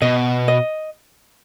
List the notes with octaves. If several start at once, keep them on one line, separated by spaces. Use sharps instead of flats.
B2 D#5
D#5